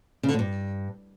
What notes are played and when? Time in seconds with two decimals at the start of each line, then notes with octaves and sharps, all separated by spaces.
0.23 C#3
0.29 D3
0.34 A2
0.39 G2